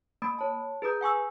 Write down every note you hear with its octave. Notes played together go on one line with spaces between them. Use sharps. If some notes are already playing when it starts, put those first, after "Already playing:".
A#3 B5 D#6 A6 D7
C#5 A5
G#4 B4 A#5 D#6 G6
F#5 G#5 C#6 E6